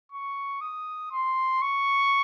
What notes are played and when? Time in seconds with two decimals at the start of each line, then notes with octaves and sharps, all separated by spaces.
0.12 C#6
0.61 D#6
1.11 C6
1.61 C#6